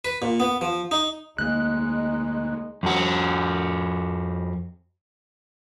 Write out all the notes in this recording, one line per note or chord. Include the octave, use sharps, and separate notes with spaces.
B4
A#2
B3
F3
D#4
D2 G#3 A#3 D#4 F#6
F2 F#4